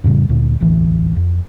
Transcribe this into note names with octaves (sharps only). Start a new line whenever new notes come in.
F2 A2 C#3 G3
D2 A#2
E1 A1 D2 E3
F2